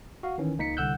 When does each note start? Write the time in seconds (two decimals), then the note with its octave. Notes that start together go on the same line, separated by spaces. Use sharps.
0.23 F#4 F5
0.38 D#3 E3 C#4
0.58 C#2 A#3 D#4 B6 C#7
0.77 C2 D3 F#5 E6 F#6 G6